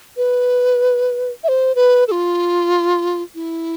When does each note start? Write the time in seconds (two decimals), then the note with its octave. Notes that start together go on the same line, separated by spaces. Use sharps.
0.17 B4
1.44 E5
1.48 C5
1.75 B4
2.08 A4
2.12 F4
3.35 E4